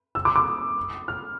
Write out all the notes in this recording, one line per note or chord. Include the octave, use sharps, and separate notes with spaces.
E6
D6
D6
D#6
F6